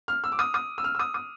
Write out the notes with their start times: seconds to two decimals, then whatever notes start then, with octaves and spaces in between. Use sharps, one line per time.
0.08 F6
0.24 E6
0.32 D6
0.39 D#6
0.54 D#6
0.78 E6
0.84 F6
0.95 E6
0.99 D#6
1.14 D#6